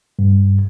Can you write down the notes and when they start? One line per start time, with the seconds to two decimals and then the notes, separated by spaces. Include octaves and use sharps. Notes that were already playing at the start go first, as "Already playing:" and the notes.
0.19 G2